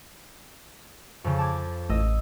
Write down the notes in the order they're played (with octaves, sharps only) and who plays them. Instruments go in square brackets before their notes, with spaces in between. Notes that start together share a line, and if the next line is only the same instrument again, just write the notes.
[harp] F2 C#3
A5 D6 G#6
[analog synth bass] A1 [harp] D#5 E6